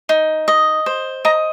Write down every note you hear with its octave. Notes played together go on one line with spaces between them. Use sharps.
D#4
D#5
C5
D#5 A#5